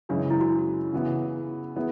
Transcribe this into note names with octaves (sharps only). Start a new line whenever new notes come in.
F#2 C#3 E3 G#3 D4
D4
E4
F#4
C#3 E3 B3
E3 B3 E4 G#4